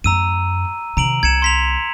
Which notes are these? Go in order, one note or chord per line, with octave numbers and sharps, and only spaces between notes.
F#2 A3 A#5 E6 D#7
C3 D#3 A#5 D7 F#7
C2 G#6 C#7 E7
C6 B6 F7